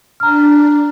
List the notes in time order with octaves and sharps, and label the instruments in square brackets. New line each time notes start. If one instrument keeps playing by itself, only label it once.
[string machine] D4 [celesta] A#5 F6